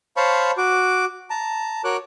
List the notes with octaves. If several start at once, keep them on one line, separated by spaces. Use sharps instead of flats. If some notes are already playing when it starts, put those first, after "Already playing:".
C5 C#5 F5 A5 B5 C#6
F#4 D6
A5 A#5
F#4 A#4 C#5 D6 F#6